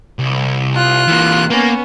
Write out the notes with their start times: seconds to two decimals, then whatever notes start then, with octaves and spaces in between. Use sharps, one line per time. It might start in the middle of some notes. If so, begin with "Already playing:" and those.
0.19 C2
0.74 F4 F#6
1.08 E3 A#3
1.50 A#3 B3 C#4